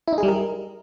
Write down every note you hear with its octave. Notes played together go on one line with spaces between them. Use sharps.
E4
D#4
G#4
G3
A#4